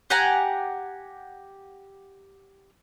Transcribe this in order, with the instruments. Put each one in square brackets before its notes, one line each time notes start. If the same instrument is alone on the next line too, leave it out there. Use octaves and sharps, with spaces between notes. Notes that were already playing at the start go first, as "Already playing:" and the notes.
[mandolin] G4 F#5 G#5 A#5